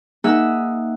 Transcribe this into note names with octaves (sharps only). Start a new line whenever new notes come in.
A#3 D#4 G#4 E5 F#5 E6